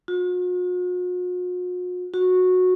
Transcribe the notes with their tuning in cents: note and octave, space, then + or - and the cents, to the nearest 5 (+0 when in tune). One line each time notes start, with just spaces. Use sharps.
F#4 -45
F#4 -15